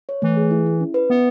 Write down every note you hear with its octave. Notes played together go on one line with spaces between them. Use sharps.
C#5
E3 A3
G#4
E4
E4
C#4
B4
B3 E5